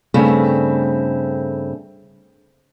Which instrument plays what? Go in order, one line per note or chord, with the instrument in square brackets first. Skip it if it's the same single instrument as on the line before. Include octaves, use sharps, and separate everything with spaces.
[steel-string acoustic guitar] G2 C#3 A3 C4